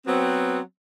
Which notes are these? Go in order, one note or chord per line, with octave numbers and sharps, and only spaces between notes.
F#3 B3 C4